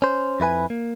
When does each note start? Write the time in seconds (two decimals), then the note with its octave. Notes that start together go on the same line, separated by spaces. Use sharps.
0.02 C#4 C5
0.40 F2 E4 B4 G#5
0.70 A#3